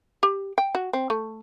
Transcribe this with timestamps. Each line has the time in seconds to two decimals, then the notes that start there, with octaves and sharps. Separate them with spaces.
0.23 G4
0.58 G5
0.75 F#4
0.93 C4
1.10 A3